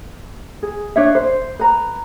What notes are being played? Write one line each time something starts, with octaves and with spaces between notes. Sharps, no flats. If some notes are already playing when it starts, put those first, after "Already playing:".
G#4
D4 C#5 E5
C5
B4 A#5